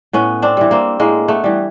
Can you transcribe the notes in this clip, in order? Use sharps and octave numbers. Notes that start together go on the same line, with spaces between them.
A2 B3 C#4
C4 D4
E3 G3
A#3 C4
A2 G#3 A#3
A3 B3
E3 G3